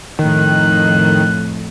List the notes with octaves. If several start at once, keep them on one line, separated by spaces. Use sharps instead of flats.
F2 A2 D#3 F3 F#6